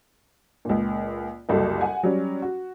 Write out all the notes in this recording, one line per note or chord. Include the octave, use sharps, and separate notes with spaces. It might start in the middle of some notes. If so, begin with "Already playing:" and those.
C#2 A#2
F#1 C2 F#4 A4
F#5 G#5
F#3 G3 C#4
F#4